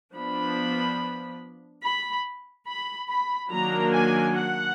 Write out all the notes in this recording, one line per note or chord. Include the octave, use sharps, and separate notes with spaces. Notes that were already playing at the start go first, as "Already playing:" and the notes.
F3 B3 D4 B5
B5
B5
B5
D#3 F#3 A#3 D4 A#5
G#5
F#5